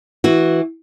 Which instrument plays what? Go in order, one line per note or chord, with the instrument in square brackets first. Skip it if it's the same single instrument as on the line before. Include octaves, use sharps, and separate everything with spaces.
[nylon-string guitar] E3 F#4